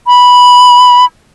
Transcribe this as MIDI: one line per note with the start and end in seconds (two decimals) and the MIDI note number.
0.07 1.05 83